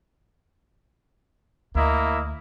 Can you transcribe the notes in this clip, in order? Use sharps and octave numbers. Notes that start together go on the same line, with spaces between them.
D2 A#3 E4 D#5